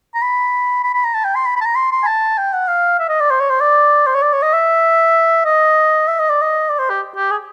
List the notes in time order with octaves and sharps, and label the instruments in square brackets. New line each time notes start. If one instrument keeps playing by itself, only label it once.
[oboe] A#5
B5
B5
B5
A#5
A5
G5
C6
B5
B5
A5
A#5
C6
C6
G#5
A5
G5
F#5
F5
E5
D#5
D5
C5
C#5
C5
D5
C5
C#5
D5
C#5
D#5
E5
D#5
E5
D#5
D5
D#5
D5
C5
G4
G4
G#4